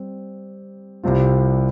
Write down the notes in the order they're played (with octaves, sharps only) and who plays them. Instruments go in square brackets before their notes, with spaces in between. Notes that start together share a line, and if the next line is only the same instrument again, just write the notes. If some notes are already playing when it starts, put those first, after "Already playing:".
Already playing: [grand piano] G3 C4
C2 C3 G3 C4 F4